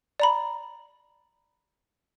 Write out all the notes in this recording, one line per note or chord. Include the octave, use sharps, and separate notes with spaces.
D5 A#5 B5